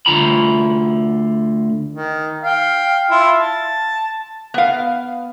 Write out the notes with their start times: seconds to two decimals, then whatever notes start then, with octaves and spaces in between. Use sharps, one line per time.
0.06 D2 G#2 D3 F4 A#5 B5
1.91 D#3
2.43 F5 G5
3.10 E4 F4
3.38 A5
4.54 B3 F5